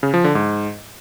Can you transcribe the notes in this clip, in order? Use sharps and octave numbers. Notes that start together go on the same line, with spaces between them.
C#3
F3
D3
G#2